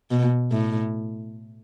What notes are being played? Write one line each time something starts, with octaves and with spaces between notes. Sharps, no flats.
B2
A2